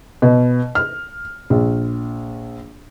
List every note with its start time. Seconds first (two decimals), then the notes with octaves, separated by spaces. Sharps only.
0.22 B2
0.75 F6
1.50 A#1